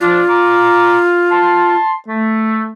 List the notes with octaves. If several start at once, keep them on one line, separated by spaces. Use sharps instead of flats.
F3 D4 F4
A#5 D6
A5 C6
A3